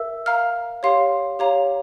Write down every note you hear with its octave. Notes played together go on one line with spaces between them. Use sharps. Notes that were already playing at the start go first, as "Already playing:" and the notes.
Already playing: A#4 E5 E6
F5 A#5 F6
G4 C#5 F5 C6
G4 C#5 F5 A#5